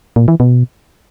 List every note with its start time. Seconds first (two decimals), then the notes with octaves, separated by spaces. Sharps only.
0.16 A#2
0.28 E3
0.40 B2